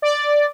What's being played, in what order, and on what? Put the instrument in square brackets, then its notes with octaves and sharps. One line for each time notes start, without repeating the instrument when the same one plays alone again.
[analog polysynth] D5